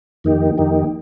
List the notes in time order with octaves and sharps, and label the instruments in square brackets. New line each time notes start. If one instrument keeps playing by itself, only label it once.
[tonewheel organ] F2 D#3 A#3 D#4 G4
F2 D#3 A#3 D#4 G4